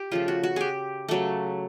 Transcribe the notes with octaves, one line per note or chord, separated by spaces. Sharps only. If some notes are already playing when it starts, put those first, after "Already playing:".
Already playing: G4
C#3 F3 A3 F4
F#4
F#4
G4 G#4
C#3 F#3 A3